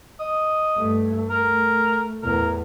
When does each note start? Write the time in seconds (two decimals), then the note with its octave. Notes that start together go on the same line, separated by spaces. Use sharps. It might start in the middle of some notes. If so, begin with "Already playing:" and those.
0.20 D#5
0.75 G2 A3
1.30 A3 A#4
2.23 E2 A2 A#4